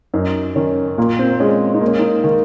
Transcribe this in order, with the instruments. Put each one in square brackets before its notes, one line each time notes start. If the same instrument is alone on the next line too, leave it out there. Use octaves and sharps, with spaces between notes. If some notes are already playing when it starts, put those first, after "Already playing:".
[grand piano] F#2 [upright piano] D#4
[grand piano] D#3 [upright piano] C#4
[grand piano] A#2 [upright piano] A#3
[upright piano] C4
[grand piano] G#3 [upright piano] C#4
[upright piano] D#4
[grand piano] A#3
[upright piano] C#4
D#4
[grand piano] D#3